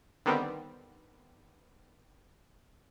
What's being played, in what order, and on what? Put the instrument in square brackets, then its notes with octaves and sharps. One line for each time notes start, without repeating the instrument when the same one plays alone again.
[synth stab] D3 D#3 G3 B3 C4